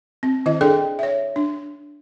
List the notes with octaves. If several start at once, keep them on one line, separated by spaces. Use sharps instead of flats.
C4
D#3 E4 D#5
D4 G#4 A4 D5 G5
C#5 E5
D4